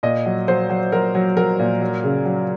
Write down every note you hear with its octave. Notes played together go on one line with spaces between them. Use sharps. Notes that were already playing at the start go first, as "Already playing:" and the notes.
A#2 D#5
F#3
F#3 C5
F#3
F#3 A#4
F#3
F#3 A#4
A#2
F#3
C#3
F#3